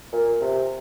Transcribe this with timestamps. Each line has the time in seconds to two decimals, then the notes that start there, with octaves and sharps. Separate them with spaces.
0.13 A#2
0.41 C3